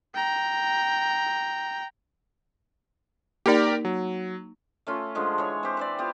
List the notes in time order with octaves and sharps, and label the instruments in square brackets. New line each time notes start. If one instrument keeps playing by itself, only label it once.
[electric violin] G5 A#5
[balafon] A#3 D#4 [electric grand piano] G4 A#4 D5
[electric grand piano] F#3
[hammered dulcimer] A3 C#4 F4
D3 F3 G#3
E3 G#4 C#5
C4 G4
B4 C5 D5
B3 F4 G4